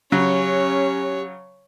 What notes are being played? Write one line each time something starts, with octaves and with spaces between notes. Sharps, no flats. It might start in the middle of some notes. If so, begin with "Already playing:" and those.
C#3 F#3 C#4 G4 C#5